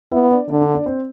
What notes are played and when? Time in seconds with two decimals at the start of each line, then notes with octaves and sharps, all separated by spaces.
0.11 B3 E4 E5
0.31 D4 D5
0.49 D3 D4 D5
0.61 D4 D5
0.74 D4 D5
0.86 C4 C5